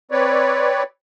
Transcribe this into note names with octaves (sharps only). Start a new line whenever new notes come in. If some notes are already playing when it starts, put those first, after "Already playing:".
C4 B4 C#5 D5